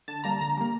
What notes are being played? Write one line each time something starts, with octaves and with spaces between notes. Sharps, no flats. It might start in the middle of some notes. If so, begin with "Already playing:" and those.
D3 A5
G3 A#3 A#5
D3 A#5
G3 A#3